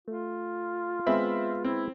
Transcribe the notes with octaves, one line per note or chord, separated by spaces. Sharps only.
A3 F4
G#3 B3 C4 E5 B5
C4 E4